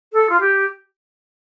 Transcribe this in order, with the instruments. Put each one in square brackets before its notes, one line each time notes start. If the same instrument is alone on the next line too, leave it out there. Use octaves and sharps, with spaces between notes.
[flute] A4
F4
G4